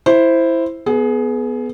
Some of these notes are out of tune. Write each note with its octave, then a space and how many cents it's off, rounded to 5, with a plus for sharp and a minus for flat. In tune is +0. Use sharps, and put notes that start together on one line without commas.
E4 +5 C5 +0
B3 +0 G#4 +25